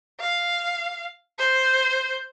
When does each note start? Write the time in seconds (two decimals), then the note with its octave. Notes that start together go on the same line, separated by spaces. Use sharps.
0.20 F5
1.38 C5